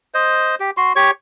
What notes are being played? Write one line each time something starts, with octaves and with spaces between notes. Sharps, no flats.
C5 D#5
G4
F#4 C6
G4 C#5 C#6